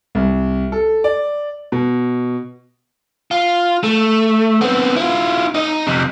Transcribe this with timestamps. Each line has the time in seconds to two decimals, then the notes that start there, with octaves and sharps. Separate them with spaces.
0.15 C2
0.72 A4
1.04 D5
1.72 B2
3.31 F4
3.84 A3
4.61 B3 C4
4.96 E4 F4
5.55 D#4 D#5
5.87 F2 C3